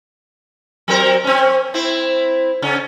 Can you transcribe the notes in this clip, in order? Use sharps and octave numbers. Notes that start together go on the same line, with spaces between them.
F#3 C4 A#4
C4 C#4
C4 E4
C#3 C#4